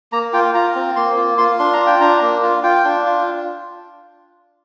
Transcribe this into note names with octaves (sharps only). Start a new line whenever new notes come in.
A#3 A#5
F4 G5
F4 A#5
C4
A#3 C6
F4
F4 C6
D4 C6
A#5
F4
G5
D4 A#5
A#3
F4
F4 G5
D4
F4